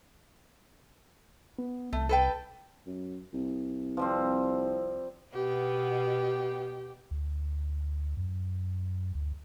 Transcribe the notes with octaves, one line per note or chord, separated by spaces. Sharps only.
B3
C2 A3
A4 B4 G5
F#2
C2
F3 G3 C4
B2 B3 G4
D2
F#2
D2